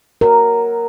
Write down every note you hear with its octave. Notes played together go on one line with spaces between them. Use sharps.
F#3 A#4